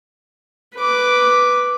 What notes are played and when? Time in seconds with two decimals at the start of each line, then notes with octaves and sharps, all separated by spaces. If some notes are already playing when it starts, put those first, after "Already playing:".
0.77 B4 D6